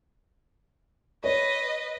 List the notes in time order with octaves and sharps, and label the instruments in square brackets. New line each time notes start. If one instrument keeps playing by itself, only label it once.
[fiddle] B4 [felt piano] C#5 [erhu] D#5